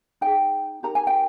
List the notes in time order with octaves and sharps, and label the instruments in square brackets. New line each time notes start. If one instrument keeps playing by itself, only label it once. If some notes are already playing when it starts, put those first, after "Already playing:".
[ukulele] D#4 G#4 G5
D#4 G4 A#4 A#5
G#5
G5